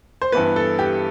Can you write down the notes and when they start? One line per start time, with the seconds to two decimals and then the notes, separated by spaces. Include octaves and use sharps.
0.21 C5
0.32 G2 E3 B3 B4
0.56 A4
0.79 G4